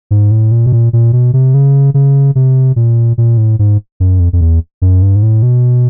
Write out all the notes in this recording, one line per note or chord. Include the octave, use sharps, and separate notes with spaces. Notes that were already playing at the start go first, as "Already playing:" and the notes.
G#2
A2
A#2
B2
A#2
A#2
B2
C3
C#3
C#3
C3
A#2
A#2
A2
G#2
F#2
F2
F2
E2
F#2
G2
G#2
A2
B2